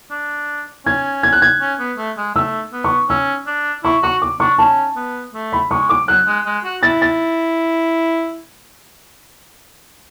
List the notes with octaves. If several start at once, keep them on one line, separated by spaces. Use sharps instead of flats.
D4
C#4 G#6
G#6
F#6
G#6
C#4
B3
A3
G#3
A3 E6
B3
C#6
C#4 E6
D4
E4 C#6
F#4 C#6
D6
D4 C#6
C#4 A5
B3
A3
B5
G#3 C#6
D6
F#3 F#6
G#3
G#3
F#4
E4 A6
A6